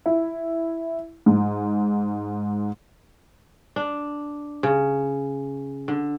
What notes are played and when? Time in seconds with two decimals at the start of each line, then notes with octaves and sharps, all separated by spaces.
0.06 E4
1.26 G#2
3.76 D4
4.63 C#3
5.88 D3